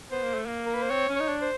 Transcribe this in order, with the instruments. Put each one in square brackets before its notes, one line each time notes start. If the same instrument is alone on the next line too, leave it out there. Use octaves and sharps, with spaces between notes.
[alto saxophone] B3 [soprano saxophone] C5
[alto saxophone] A#3
A3
A#3
[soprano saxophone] A#4
B4
C5
[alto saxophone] C4 [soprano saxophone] C#5
[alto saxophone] C#4
[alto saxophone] D#4 [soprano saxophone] C#5
[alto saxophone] D4
[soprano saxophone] C5